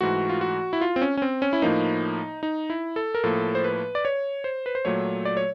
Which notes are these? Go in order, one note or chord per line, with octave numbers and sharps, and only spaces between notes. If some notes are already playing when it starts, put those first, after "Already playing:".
G#2 E3 A3 F#4
F4
F#4
E4
F4
C4
C#4
C#4
C4
C#4
E4
A2 F3 A#3 D#4
D#4
E4
A4
A#4
A2 F3 A#3 A4
C5
B4
D5
C#5
C5
B4
C5
A#2 F#3 A3 C#5
D5
C#5